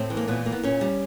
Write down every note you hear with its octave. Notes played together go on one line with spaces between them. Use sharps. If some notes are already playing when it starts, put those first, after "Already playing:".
Already playing: A2 C4
E3
A#3
A#2 B3
A#3
B3
A#2 C#4
G3